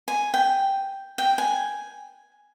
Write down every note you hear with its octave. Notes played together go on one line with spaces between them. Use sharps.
G#5
G5
G5
G#5